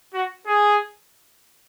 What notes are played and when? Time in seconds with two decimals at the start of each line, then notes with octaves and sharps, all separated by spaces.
0.14 F#4
0.47 G#4